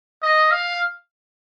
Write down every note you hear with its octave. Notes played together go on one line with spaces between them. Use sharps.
D#5
F5